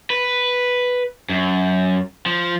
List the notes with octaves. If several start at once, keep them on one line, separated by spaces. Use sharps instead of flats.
B4
F#2
F3